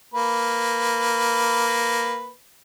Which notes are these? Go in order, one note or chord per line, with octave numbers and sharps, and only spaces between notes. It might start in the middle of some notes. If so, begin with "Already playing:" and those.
A#3 B4